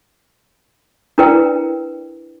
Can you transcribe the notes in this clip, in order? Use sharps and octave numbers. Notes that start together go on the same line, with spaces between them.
D4 E4 A#4 B4 D5 G5